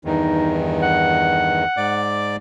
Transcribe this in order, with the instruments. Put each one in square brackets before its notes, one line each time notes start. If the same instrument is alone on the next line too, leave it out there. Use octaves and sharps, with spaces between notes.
[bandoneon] E2 G2 D#3 [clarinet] D#4
[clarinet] F#5
[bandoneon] G#2 D5 D6